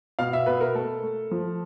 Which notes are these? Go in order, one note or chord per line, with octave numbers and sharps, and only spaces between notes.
B2 F5
E5
B2 B4
A#4
A3 A4
A3
F3